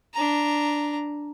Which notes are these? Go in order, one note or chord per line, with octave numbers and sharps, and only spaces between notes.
D4 A#5